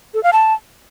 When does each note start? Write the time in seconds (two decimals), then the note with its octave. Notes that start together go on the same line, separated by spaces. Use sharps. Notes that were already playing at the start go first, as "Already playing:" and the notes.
0.14 A4
0.23 F5
0.33 A5